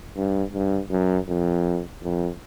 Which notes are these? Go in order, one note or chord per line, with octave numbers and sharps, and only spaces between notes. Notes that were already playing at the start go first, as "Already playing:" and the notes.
G2
G2
F#2
F2
F2